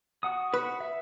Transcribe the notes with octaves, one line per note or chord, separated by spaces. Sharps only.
F#4 F#5 D#6
B4
E5